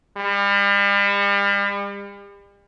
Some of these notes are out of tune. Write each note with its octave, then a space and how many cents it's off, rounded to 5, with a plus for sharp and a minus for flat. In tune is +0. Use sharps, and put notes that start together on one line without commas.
G3 +40